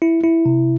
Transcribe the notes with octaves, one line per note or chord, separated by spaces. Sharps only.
E4
E4
C3